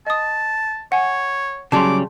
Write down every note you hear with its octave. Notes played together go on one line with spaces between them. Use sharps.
D#5 A5 D#6
C#5 F#5 G#5
C#3 F#3 G3 A5 C6 D6